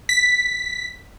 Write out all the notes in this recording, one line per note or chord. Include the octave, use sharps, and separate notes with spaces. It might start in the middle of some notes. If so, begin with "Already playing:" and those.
B6